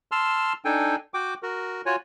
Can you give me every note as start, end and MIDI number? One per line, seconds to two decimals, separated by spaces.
0.12 0.53 81
0.12 0.53 84
0.12 0.53 88
0.12 0.53 89
0.65 0.96 62
0.65 0.96 63
0.65 0.96 69
0.65 0.96 79
0.65 0.96 80
1.14 1.34 66
1.14 1.34 79
1.14 1.34 86
1.43 1.82 66
1.43 1.82 70
1.86 1.96 65
1.86 1.96 66
1.86 1.96 73
1.86 1.96 80